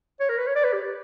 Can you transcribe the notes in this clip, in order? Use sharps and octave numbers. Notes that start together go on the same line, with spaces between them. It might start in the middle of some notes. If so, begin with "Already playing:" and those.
C#5
A#4
B4
C#5
D5
B4
G4